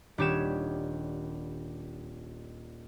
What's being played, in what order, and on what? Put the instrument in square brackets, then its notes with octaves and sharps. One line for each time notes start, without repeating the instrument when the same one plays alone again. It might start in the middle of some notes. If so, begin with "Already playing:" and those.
[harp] D#1 D4 G4 C#5 G#6 E7